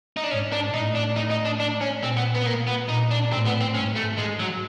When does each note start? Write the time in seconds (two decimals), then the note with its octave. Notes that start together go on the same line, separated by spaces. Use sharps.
0.17 D#4
0.24 D4
0.31 G#2 C#4
0.52 D4
0.73 A2 D#4
0.95 D4
1.17 D#4
1.31 D#4
1.45 D4
1.60 D4
1.81 C#4
2.02 A#2 C4
2.17 B3
2.35 B3
2.46 A#3
2.67 B3
2.89 A#2 D#4
3.11 D4
3.32 A2 C4
3.46 B3
3.61 C4
3.75 G#2 C#4
3.96 A3
4.18 G#2 G#3
4.40 F#3